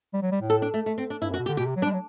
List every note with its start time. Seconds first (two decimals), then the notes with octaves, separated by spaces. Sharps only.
0.14 G3
0.22 F#3
0.32 G3
0.41 A2
0.50 A4
0.62 D4
0.74 A3
0.86 A3
0.98 C4
1.10 D4
1.22 G2 E4
1.31 F#2
1.34 F#4
1.39 B2
1.46 D3 G4
1.57 B2 G4
1.67 C3
1.76 F#3
1.82 D4
1.85 G3
1.93 F#3